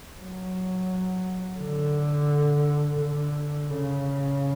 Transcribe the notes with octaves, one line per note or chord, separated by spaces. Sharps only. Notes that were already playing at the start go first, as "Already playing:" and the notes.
F#3
D3
D3
C#3